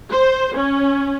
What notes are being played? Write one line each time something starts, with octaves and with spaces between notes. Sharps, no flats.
C5
C#4